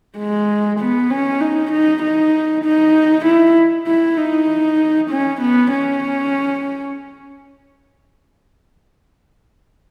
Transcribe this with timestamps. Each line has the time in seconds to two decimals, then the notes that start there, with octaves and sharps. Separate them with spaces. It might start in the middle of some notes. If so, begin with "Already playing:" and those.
0.17 G#3
0.80 B3
1.10 C#4
1.41 D#4
1.72 D#4
2.03 D#4
2.64 D#4
3.25 E4
3.87 E4
4.18 D#4
5.10 C#4
5.41 B3
5.72 C#4